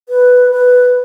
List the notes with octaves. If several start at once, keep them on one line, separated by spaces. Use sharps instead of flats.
B4
B4